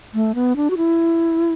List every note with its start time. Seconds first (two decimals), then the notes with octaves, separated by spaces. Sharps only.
0.14 A3
0.35 B3
0.56 D4
0.70 F#4
0.77 E4